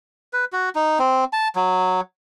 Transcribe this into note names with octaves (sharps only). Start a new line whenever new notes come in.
B4
F#4
D#4
C4
A5
F#3